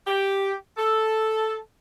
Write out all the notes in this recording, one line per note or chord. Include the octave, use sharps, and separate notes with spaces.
G4
A4